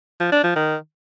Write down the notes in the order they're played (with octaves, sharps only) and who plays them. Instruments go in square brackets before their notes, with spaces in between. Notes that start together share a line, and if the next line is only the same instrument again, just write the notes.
[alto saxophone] F3
D4
F3
D#3